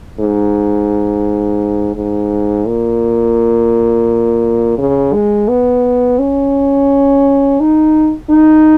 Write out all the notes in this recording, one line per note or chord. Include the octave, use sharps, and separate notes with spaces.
G#2
G#2
A#2
C#3
G#3
B3
C#4
D#4
D#4